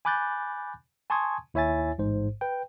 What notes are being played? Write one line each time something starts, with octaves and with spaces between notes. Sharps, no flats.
G#5 B5 D6 F#6 G6 A6
G#5 A5 C6 C#6 D#6 G#6
D#2 E4 C#5 E5 G#5 A6
A1 G#2 C5
B4 G5